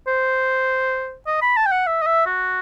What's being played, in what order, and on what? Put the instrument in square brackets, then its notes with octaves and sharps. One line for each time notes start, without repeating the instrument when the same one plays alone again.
[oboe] C5
D#5
B5
A5
G5
F#5
E5
D#5
E5
F#4